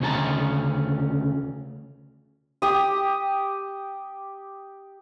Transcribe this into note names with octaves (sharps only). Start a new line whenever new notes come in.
D2 C#3 C#4 G4 A5 A#5
G4 D#6